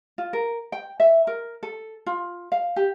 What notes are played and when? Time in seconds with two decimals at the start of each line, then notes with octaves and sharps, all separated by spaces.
0.18 F4
0.33 A#4
0.72 G5
1.00 E5
1.27 A#4
1.63 A4
2.06 F4
2.52 F5
2.76 G4